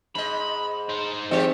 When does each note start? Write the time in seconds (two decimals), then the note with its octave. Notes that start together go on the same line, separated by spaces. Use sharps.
0.15 G#2 D#5 B5
0.89 D#4 C5
1.31 E3 G#3 C4 D#4 G4 G#4 C5 D#5